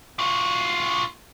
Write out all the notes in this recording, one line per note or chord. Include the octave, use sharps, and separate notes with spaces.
F4 F#4